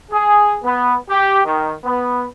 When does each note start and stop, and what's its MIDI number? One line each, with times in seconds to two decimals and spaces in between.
0.11 0.56 68
0.63 0.95 59
1.10 1.39 67
1.45 1.72 51
1.84 2.24 59